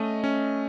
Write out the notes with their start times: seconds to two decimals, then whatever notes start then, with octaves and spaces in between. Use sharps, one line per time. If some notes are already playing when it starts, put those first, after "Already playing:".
Already playing: A3 C#4 D#5
0.24 C#4